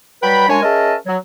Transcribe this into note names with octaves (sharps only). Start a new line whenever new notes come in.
F#3 G3 B4 G5 B5
F#2 G#3 D4 C#5 G#5
C#4 G#4 A#4 D#5 E5 A5
F#3